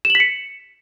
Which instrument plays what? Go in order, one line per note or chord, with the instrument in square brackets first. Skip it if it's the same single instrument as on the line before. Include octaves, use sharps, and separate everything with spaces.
[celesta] E7
F#7
B6
C#7